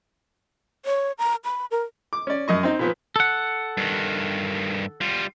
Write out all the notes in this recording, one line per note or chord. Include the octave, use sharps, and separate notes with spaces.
C#5
A#5
B5
A#4
D6
C#4 D5
F#2 D#5 C#6
C4 D#4
A#2 F3 B3
A4 F#5
G2 D#3
G3 F4